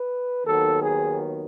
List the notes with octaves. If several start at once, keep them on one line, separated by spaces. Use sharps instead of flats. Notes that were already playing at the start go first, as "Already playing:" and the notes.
Already playing: B4
D#2 D#3 F#3 B3 A4
G#4